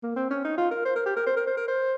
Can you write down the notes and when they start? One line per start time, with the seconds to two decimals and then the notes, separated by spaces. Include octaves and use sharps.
0.03 A#3
0.16 C4
0.30 C#4
0.45 D#4
0.58 F4
0.71 A#4
0.85 C5
0.95 A#4
1.06 G4
1.16 A#4
1.26 C5
1.37 A#4
1.47 C5
1.57 A#4
1.68 C5